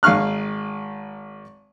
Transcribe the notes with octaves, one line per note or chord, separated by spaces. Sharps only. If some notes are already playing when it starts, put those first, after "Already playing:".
G#1 F5 C#6 F6 F#6